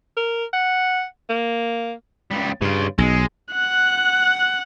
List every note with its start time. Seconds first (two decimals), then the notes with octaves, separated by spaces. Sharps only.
0.17 A#4
0.53 F#5
1.29 A#3
2.31 C#2 G3
2.62 G2 C#3 F4
2.98 B1 G#3
3.54 F#5 F#6